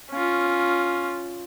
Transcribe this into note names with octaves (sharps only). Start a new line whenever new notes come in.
C#4 F4